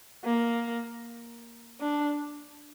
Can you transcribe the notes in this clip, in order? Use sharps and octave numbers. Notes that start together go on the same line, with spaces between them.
A#3
D4